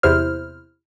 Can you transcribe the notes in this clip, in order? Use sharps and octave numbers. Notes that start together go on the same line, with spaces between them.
E2 C3 E4 C5 F6